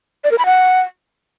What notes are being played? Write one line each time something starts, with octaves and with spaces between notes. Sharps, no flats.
D5
A#4
B5
F#5